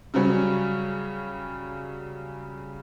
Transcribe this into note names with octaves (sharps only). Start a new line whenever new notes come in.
C#3 F#3 G3 C#4